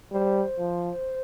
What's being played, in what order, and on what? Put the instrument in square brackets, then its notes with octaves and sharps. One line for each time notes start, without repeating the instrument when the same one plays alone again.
[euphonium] G3 [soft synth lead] C5
[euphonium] F3